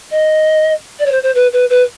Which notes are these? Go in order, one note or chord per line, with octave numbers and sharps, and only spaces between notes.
D#5
D5
C#5
C5
C5
B4
B4
B4